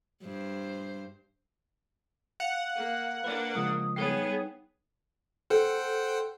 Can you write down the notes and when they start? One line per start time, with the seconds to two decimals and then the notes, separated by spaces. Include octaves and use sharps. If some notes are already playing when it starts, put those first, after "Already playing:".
0.23 G2 C5
2.40 F5 F#5
2.75 A#3
3.24 A#3 D4 B4 D5
3.55 C#3 F3 G#3 D#6
3.96 G3 B3 D#4 G#4 C#5
5.50 A4 C5 F#5 G5